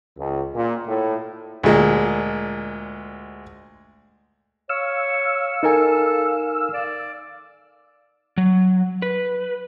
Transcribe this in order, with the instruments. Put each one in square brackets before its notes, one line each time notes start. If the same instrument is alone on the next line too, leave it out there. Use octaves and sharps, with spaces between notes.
[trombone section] C#2
A#2
A2
[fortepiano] D2 A#2 G#3
[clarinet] C#5 [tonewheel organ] F5 E6
[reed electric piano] D#4 A#4 G#5 [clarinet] A4
[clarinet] D5
[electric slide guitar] F#3
B4